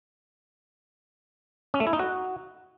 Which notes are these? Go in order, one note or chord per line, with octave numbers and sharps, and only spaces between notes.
C#4
A3
E4
D#4
F#4